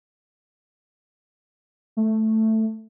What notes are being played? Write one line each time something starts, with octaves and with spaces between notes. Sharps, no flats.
A3